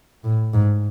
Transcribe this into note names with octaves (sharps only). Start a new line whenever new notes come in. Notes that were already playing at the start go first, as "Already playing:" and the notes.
A2
G#2